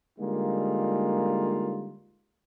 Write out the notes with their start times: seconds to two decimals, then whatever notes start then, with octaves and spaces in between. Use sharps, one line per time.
0.19 D3 G3 G#3 A#3 D#4 F4